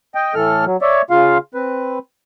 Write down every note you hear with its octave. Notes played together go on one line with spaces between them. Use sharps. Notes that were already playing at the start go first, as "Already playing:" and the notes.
D#5 G5
A2 E3 A4 F6
F#3
C#5 D5 E5
C#3 F4 F5
C4 B4